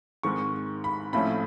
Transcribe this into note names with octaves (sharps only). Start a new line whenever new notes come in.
G#2 D#3 G#3 C4 C#6
B5
A#1 A2 F3 A3 C#4 B5